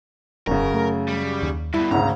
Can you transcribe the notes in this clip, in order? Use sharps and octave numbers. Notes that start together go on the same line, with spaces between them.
E1 F#2 C#3 A#4
A3
G3
D#2
G2 B2 E4 B5
G#1 D2 C#3 A#5